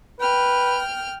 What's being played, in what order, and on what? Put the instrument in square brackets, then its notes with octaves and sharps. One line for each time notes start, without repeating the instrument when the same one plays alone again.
[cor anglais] B4 [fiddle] G5 F6